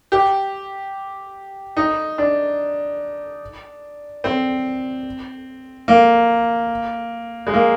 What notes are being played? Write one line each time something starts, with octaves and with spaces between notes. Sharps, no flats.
G4
D#4
D4
C4
A#3
G#3
A#3